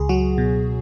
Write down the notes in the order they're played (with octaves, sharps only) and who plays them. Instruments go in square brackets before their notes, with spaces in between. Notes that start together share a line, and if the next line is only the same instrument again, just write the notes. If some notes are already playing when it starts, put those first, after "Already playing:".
Already playing: [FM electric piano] C#2 G#4
F#3 F#4
B2